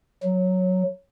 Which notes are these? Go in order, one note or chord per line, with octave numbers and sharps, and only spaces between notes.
F#3